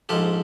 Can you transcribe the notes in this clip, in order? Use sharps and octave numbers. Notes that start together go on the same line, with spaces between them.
A#1 G#2 F3 G4 A4